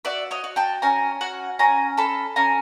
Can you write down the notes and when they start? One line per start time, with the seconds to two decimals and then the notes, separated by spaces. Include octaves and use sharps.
0.05 F#4 D5 E5
0.31 C#5 D#5
0.44 F#4
0.56 G5 A5
0.82 C#4 G#5 A#5
1.21 F#4 F#5 G#5
1.59 C#4 G#5 A#5
1.97 A4 A5 B5
2.36 C#4 G#5 A#5